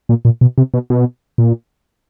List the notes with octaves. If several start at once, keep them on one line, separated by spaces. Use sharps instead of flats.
A#2
A#2
B2
C3
B2
B2
A#2